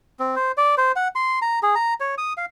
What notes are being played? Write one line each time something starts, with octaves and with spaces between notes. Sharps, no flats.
C4
C5
D5
C5
F#5
C6
A#5
G#4
A#5
C#5
D#6
F5